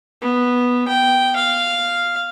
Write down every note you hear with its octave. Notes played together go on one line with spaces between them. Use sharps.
B3
G5
F5